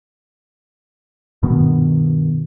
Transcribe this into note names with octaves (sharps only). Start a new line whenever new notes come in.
G2 B2 D#3 B3